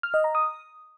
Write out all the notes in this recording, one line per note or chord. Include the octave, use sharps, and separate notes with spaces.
F6
D#5
A#5
D#6